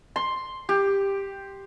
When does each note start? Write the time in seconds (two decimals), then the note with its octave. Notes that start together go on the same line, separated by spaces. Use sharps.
0.16 C6
0.69 G4